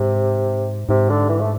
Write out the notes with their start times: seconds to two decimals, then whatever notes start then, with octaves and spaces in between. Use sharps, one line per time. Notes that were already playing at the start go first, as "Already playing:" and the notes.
Already playing: G#2 C3
0.89 G#2 C3
1.09 D3
1.29 E3
1.41 A3